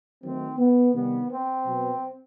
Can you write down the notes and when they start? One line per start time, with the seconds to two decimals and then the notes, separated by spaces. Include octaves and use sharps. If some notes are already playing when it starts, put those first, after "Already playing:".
0.23 D#3 F#3 A3 C4
0.58 B3
0.94 C3 D#3 G3 B3
1.30 C4
1.65 B2 F#3 B3